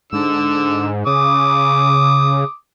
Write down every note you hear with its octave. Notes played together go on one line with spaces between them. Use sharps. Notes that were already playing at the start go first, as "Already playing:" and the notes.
G#2 D3 E6
C#3 D6 D#6